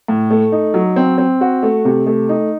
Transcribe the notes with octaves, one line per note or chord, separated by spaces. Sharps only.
A2
A3
D#4
F#3
C4
C4
F#4
A3
C3
A3
D#4